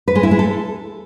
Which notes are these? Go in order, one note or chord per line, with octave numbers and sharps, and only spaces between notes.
B4
G#3
E4
G#3
A4